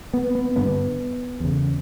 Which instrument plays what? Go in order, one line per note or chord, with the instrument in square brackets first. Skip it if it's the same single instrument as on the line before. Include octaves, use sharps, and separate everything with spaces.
[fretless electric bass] B3
B3
G2 D3 B3
E2 C#3